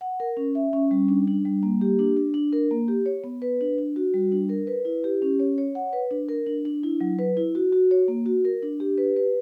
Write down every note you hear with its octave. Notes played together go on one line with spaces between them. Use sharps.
F#5
A#4
C#4
E5
C#4
G3
D4
D4
G3
A#3
G4
D4
D4
D4
A#4
A#3
G4
C#5
B3
B4
D4
D4
F#4
G3
D4
A#4
B4
E4
G4
C#4
C#5
C#5
F#5
B4
D4
A#4
D4
D4
E4
F#3
B4
E4
F#4
F#4
C#5
A#3
F#4
A#4
D4
G4
B4
B4